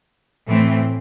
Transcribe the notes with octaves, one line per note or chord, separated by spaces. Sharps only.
A2 E3 A3 C4